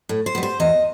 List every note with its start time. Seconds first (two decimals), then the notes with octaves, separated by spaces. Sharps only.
0.09 A2
0.26 C5
0.35 G3 B3
0.43 C5
0.60 E2 D#5